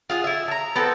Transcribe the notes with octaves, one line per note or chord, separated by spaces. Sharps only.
F4 G#4 F#5
E4 E5
A5 A#5
B3 C4 A4